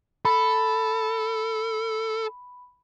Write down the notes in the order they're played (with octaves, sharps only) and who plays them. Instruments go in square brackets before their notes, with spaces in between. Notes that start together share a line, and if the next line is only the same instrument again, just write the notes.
[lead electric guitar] A4 [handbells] B5